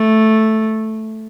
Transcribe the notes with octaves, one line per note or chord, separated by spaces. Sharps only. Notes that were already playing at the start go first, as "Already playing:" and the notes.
Already playing: A3